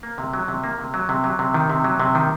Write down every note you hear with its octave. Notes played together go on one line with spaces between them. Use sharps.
A#3
C3
F#3
C3
A#3
C3
F#3
C3
F#3
C3
D#3
C3
F#3
C3
D#3